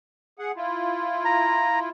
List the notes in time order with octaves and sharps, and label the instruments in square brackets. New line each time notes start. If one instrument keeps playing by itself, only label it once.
[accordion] G#4 F#5
E4 F4
[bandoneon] A#5